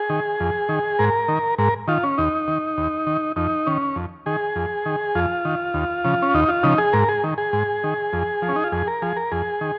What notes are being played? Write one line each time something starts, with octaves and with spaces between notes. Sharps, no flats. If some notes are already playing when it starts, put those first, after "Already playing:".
Already playing: G#4
D#3
F2
D#3
G#2 A#4
D#3
G#2 A#4
D#3 F4
C#4
D#2 D#4
D#3
D#2
D#3
F2 D#4
D#3 C#4
F2
D#3 G#4
F2
D#3
F2 F4
D#3
D#2
C#3 F3
C#4
D#2 D#4
F4
C#3 F3 D#4
G#4
G#2 A#4
G#4
D#3
G#4
G#2
D#3
F2
F3
C#4
D#4
F4
F2 G#4
A#4
F3 G#4
A#4
F2 G#4
D#3